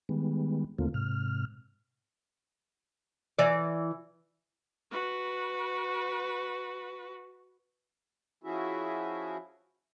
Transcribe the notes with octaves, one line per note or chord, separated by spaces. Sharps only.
D#3 G3 G#3 B3
D#2 D3 A3 A#3 C4 F4
G#2 C3 F6
E3 D5
F#4 B4
F3 C#4 E4 F#4 G#4 E5